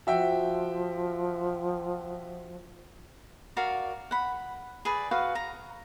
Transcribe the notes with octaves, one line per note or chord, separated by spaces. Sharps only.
F3 F#4 E5 G5
F#4 A#4 D5 F5
F#5 B5
G#4 B4 D5
F#4 B4 F5
A#5